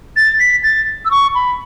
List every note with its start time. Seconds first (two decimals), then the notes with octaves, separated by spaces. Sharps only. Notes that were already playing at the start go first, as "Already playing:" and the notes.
0.16 A6
0.40 B6
0.63 A6
1.05 E6
1.11 C#6
1.35 B5